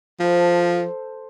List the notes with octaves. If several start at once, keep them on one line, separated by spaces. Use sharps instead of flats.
F3 A4 C5